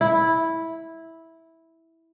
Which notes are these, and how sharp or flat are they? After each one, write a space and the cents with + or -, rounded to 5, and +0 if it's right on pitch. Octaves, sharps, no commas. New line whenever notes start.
E4 -10